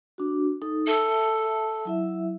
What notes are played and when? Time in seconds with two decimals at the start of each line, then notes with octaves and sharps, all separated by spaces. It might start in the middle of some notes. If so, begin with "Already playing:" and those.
0.18 D4 F#4
0.62 D#4 A4
0.87 A4 E5 A5
1.85 F#3 E4 E5